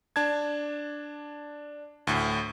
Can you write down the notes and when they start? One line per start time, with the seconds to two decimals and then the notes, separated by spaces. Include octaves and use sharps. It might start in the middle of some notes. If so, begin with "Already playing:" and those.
0.16 D4 A5 G#6
2.07 D2 A2